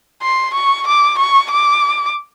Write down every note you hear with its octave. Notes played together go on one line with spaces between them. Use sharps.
C6
C#6
D6
C#6
D6